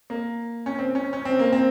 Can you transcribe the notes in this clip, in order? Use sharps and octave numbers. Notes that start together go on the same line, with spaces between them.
A#3
C#4
C4
C#4
C#4
C4
A#3
C4